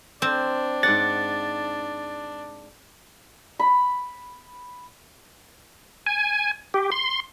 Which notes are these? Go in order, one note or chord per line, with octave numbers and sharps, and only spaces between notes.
C4 D4
G#2 D5 F#5 A6
B5
G#5
G4
C6